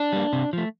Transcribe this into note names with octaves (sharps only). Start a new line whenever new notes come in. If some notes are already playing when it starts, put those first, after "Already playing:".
Already playing: D4
G3 A#3
C3
F3 A3